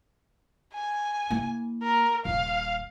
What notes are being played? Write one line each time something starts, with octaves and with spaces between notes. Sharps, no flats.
G#5
A#3 E4
A#4
D#1 F5